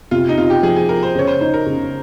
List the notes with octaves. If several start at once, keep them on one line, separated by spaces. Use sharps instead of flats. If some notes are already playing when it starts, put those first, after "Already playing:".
C3 F4
D#4
C3 F4
G4
F3 G#4
G#4
F4 A#4
C5
C#3 C#5
C5
D#4 C5
A#4
C#3